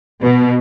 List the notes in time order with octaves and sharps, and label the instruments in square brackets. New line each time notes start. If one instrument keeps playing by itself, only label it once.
[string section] B2